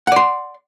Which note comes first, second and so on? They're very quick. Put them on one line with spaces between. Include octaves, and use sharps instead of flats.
F#5 D5 C6